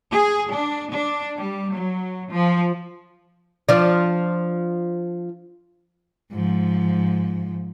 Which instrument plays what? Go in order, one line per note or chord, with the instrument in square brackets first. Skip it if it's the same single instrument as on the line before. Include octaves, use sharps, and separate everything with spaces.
[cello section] G#4
D4
D4
G3
F#3
F3
[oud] F3 D4
[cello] G#2 F3